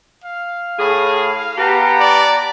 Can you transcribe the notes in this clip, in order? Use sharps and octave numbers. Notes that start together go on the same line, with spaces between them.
F5
A2 G#4
B3 G4 F#5 A5 A#5
D5